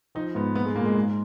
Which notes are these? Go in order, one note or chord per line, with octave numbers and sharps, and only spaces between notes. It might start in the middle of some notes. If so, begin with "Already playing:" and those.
F3 D#4
G#2 B3
A#2 B3
G#3
A#2 A#3
G#3
G#2